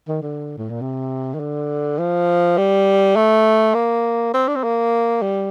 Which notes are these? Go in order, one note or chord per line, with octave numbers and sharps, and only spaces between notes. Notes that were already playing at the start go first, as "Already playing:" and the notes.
D#3
D3
A2
A#2
C3
D#3
D3
F3
G3
A3
A#3
C4
D4
C4
A#3
G3